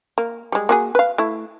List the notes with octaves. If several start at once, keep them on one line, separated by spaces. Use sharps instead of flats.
A#3
G3 G#3
A#3 F#4 G#4
B4 F5
A3 E4